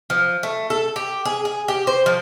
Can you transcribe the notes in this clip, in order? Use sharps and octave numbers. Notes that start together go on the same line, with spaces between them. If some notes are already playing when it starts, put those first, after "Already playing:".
F3
A3
A4
G4
G#4
G#4
G4
C5
F3